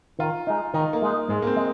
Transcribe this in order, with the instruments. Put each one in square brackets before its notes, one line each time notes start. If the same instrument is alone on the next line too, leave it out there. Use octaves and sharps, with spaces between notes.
[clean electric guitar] D#3 [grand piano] F4
[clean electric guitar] G#3 D#4
[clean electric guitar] D#3 [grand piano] D#4
[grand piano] A#3
[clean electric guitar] G#3 D#4
[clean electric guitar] G#2 [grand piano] G#3
[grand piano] A#3
C4
[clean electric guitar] G#3